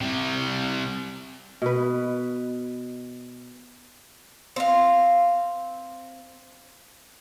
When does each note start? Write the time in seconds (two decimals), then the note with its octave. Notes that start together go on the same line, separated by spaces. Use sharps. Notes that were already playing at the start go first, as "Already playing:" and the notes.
0.01 C3 G3
1.62 B2 B4
4.56 C4 F5